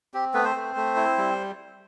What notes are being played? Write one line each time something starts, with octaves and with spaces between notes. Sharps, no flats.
C4 G4
A3 B3 B4
C4 C5
A3
A3
E4
G3